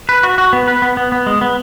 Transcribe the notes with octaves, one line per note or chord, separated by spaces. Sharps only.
B4
F#4
F#4
B3
B4
B3
B3
B3
G#3
B3